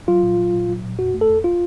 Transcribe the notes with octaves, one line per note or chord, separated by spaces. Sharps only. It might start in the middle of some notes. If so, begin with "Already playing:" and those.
F#3 F4
A#2
F#3
A#2
F#3
A#2
F2 F#4
A3
A4
F2
F4